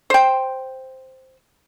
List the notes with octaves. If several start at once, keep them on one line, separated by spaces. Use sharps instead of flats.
C5 G5